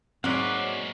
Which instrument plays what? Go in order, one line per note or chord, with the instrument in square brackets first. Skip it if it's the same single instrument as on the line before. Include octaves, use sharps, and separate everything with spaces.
[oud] G#2 F#3 [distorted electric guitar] A#3 B4 [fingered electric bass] C4 [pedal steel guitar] D5 F#5